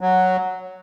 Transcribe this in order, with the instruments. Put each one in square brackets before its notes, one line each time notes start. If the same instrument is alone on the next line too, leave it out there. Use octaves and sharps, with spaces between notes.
[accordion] F#3